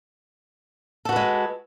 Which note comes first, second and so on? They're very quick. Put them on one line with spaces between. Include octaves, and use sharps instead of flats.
A4 F#4 B4 G#3